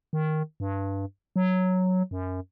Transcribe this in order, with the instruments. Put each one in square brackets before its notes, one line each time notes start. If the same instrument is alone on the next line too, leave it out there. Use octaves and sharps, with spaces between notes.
[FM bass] D#3
G2
F#3
F#2